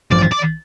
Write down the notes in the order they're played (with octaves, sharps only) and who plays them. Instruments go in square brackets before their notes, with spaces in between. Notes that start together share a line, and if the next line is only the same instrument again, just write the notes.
[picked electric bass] A1 G2 F3 [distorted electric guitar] D5
[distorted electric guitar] D5